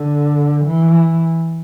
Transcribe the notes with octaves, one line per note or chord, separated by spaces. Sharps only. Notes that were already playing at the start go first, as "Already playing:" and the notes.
Already playing: D3
E3